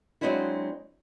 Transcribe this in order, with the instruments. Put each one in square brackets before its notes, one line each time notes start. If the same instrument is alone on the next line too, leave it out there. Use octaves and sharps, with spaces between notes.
[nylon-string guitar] F#3 G#3 C4 D4 E4 F#4